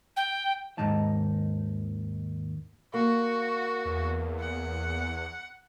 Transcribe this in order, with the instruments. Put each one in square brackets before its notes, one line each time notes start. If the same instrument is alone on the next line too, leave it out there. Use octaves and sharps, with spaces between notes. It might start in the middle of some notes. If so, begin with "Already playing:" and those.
[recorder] G5
[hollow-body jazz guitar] D#2 G#2 D#3 D#4 A5
[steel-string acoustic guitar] A#3 [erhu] F#4
[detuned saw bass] E2
[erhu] F#5